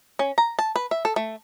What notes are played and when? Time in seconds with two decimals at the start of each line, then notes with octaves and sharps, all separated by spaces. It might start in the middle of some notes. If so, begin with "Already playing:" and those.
0.19 C#4
0.38 A#5
0.59 A5
0.76 B4
0.91 E5
1.05 A4
1.16 A3